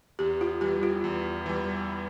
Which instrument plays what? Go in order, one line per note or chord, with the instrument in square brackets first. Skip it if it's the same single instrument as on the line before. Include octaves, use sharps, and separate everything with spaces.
[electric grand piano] E2 [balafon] G4
[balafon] F4
[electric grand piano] E3 G3 [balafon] G4
[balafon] F4
[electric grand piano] E2
E3 G3